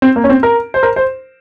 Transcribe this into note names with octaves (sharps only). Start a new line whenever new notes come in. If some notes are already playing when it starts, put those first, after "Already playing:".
C4
A#3
C#4
C4
A#4
C5
A#4
C5